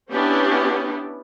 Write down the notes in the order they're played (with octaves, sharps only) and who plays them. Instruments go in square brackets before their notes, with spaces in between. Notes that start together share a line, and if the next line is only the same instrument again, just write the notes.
[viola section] B3 C#4 D4 E4 G4